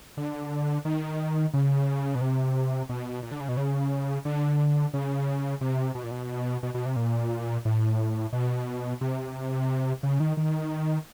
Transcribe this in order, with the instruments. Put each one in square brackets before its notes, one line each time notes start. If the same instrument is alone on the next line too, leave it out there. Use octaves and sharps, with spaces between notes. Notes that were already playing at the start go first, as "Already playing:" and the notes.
[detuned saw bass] D3
D#3
C#3
B2
C3
B2
A#2
D3
C#3
B2
C#3
D3
C#3
C3
B2
A#2
B2
B2
B2
C3
A#2
A2
B2
C3
C#3
D#3
D#3